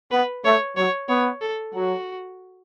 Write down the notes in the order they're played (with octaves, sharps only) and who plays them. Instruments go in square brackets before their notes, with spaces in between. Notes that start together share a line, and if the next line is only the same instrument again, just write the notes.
[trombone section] B3 [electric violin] B4
[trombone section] A3 [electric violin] C#5
[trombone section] F#3 [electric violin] C#5
[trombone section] B3 [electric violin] C#5
[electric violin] A4
[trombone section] F#3 [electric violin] F#4